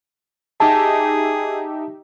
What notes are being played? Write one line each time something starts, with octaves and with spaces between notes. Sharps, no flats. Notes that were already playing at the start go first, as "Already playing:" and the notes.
D#4 G4 G#4 E5 A5